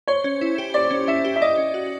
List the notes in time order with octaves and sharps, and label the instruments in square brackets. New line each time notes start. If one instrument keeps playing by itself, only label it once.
[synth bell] C5 [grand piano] C#5
[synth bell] C#4
E4
G4
[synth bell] C5 [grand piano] D5
[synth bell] C#4
[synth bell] E4 [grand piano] E5
[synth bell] G4
[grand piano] E5
[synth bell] D5 [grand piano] D#5
[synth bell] C#4
F#4